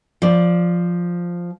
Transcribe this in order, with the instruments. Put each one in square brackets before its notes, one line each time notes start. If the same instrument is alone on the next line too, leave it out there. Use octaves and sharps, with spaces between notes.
[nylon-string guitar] F3 D5